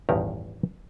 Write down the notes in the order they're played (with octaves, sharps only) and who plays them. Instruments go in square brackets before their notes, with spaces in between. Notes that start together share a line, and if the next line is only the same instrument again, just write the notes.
[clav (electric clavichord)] A1 E2 G2 D#3 G4 A#5